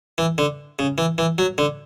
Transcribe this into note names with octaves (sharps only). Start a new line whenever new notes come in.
E3
D3
C#3
E3
E3
F#3
D3